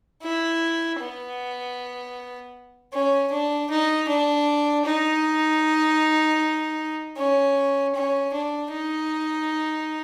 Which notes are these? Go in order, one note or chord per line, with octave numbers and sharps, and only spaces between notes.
E4
B3
C#4
D4
D#4
D4
D#4
C#4
C#4
D4
D#4